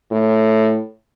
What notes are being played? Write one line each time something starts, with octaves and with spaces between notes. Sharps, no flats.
A2